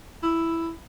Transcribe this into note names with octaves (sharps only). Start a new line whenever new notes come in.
E4